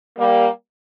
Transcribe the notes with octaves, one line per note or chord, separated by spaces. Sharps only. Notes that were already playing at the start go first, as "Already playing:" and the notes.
G3 A#3